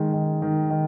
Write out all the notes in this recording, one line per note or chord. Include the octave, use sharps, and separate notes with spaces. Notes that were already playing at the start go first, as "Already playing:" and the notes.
Already playing: D#3 G#3
D#3
D#3
D#3